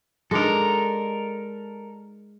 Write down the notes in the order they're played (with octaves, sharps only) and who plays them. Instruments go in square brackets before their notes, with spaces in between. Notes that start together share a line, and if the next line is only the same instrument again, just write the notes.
[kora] G#3 D4 D#4 [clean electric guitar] A4 A#4